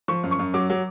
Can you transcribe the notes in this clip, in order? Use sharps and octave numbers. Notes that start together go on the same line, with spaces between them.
F3 C#6
F#2
C#6
F#2
F#3 D6
F#3